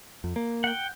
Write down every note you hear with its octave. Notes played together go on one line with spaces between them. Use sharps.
F2
A#3
F#5 G5